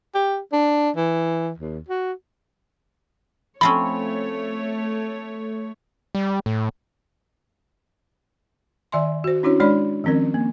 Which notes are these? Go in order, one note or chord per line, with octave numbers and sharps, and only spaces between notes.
G4
D4
E3
D#2
F#4
F3 A3 C4 C#4 C#5 B5
G3
A2
D#3 D5 E5 G#5 C6
F#4 C5
C#4 D4 E4 F#4 C#5
G#3 D4 C#5 D5 B5
D#3 F3 C4 C#4 A#4
A#3